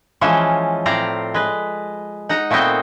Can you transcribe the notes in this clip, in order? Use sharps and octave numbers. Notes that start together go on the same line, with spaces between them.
E3 F3 G#3 C#4 F4
A2 C4 D5 F5 A#5
G#3 B4
D#4 F#5 A#5
A#2 A3 B3 C4 D#5 G5